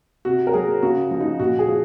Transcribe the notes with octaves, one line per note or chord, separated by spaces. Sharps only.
C3 F#4
A#4
F#3 G#4
C#3 F#4
F3
D#4
A#2 F#4
G#4
F3